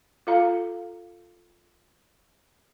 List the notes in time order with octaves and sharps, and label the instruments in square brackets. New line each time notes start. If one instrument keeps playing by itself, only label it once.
[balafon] F4 A4 F5 A#5